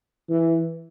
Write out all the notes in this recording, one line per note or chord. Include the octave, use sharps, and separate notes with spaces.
E3